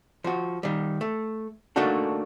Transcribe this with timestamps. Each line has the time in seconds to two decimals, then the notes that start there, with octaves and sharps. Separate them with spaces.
0.24 F3 F#4
0.63 D#3 G3
1.01 A3
1.76 A3 A#3 D4 D#4 F#4 A4